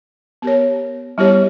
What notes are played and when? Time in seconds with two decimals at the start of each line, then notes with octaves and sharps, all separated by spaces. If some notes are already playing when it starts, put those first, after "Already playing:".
0.42 B3 G4 A#4 C#5
1.18 G3 B3 E4 G4 C#5